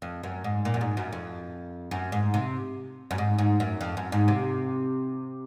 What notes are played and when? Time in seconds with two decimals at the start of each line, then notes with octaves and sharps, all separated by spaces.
0.02 F2
0.23 F#2
0.44 G#2
0.65 A#2
0.74 F#2
0.81 G#2
0.97 F#2
1.13 F2
1.91 F#2
2.12 G#2
2.34 C3
3.11 F#2
3.18 G#2
3.38 G#2
3.60 F#2
3.81 F2
3.97 F#2
4.12 G#2
4.28 C3